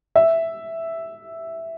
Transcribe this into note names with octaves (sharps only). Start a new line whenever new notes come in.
E5